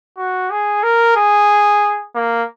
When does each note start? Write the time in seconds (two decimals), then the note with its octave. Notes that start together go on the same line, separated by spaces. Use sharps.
0.18 F#4
0.51 G#4
0.83 A#4
1.16 G#4
2.15 A#3